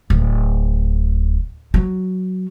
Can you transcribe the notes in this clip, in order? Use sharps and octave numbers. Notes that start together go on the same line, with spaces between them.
D1
F#3